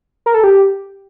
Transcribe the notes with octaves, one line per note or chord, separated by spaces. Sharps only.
A#4
A4
G4